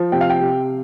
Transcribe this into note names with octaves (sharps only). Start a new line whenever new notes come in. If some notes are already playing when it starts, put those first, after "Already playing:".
Already playing: F3
C3 G5
F5
G5
C3